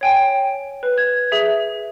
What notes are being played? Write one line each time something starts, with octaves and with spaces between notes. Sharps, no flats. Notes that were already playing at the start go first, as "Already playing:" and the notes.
C#5 G5 G#5
B4
G#6
G#4 E5